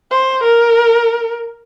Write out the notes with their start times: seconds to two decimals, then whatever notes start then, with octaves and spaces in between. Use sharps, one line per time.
0.11 C5
0.43 A#4